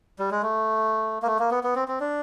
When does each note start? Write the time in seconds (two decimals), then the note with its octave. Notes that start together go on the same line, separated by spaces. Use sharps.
0.19 G3
0.31 G#3
0.42 A3
1.23 A#3
1.27 A3
1.39 A#3
1.51 B3
1.64 B3
1.75 C4
1.88 C4
2.00 D4